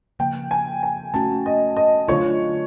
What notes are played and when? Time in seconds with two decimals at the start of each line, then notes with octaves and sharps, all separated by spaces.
0.19 C#3 F3 A#3 G5
0.51 G#5
0.83 G#5
1.14 A3 C#4 F#4 A5
1.46 D#5
1.77 D#5
2.08 D3 F#3 A3 D4 F4 C#5